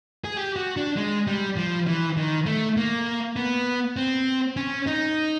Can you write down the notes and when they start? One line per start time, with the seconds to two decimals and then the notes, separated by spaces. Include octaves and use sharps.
0.24 G#4
0.37 G4
0.56 F#4
0.77 D4
0.97 G#3
1.27 G3
1.57 F3
1.87 E3
2.17 D#3
2.46 A3
2.77 A#3
3.36 B3
3.97 C4
4.56 C#4
4.87 D#4